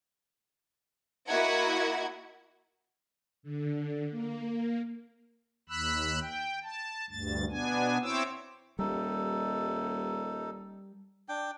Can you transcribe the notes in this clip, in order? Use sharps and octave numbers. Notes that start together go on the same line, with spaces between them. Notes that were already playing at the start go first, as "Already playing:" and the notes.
A#3 E4 F#4 D#5 F#5 G#6
D3
A#3
D#2 B5 E6 F#6
G5
A5
D2 G2 A6
B2 B3 D4 G#5
C4 E4 C5 C#5 D6 E6
D#1 G3 D#4 A4
D4 G5